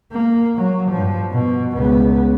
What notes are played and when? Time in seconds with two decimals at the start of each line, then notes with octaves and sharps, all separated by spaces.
0.12 A#3
0.56 F#3
0.90 G2 F3
1.33 B2
1.75 C#2 B3